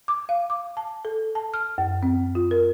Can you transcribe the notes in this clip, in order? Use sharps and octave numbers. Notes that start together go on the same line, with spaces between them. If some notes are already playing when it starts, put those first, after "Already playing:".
D6
F5
D6
A5
A4
A5
F6
F#2
C4
F4
A#4